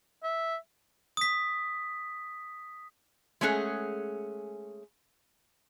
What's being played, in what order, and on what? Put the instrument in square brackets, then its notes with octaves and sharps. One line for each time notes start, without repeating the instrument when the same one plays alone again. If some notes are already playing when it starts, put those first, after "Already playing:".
[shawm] E5
[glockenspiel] D#6 B6
[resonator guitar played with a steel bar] G#3 A3 C#4 G#4 A4 F#5